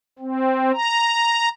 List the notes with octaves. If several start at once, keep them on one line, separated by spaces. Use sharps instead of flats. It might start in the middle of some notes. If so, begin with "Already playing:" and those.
C4
A#5